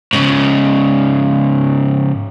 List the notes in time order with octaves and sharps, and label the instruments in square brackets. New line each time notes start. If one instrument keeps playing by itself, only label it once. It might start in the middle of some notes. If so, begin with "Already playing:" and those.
[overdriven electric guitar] G#2 C#3